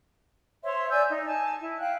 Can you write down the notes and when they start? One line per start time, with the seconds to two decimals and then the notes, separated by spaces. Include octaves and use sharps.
0.63 C5 C#5 E5 C6
0.90 D5 G#5 E6 G6
1.10 D#4
1.25 G#5 A5
1.61 E4
1.80 F5 G5 F#6